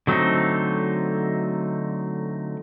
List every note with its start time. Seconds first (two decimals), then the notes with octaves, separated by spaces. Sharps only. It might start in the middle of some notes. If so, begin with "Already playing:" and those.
0.07 D3 F#3 A3 C4 D#4